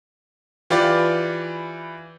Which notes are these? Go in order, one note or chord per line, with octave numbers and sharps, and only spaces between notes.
E3 F4 G4 B4 D5